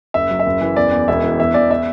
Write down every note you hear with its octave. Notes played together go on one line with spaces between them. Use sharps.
F#1 E5
F#3
E5
F#1
E3
E2 D5
E2
E1 E5
E3
E2 E5
E2 D5
E5